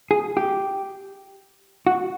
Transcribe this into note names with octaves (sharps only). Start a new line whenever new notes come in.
G#4
G4
F#4